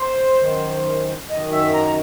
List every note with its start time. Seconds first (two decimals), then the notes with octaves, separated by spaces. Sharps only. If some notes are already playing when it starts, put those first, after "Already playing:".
Already playing: C5
0.41 F#2 D#3
1.29 F#2 D#3 D#5
1.52 E5
1.74 A#5